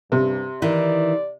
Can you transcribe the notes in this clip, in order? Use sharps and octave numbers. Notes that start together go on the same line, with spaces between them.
G2 C3
D#3 E3 D5